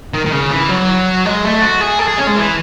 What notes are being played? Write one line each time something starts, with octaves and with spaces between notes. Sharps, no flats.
D#3
D#3
C#3
E3
F#3
G#3
A3
F#4
G#4
A4
G#4
C#4
G#3
E3